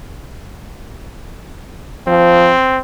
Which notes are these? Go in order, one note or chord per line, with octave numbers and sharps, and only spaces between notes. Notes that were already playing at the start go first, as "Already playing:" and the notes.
F3 C4